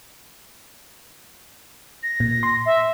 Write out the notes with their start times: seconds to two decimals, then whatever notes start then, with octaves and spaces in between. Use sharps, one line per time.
2.03 A#6
2.20 A#2
2.43 C6
2.66 E5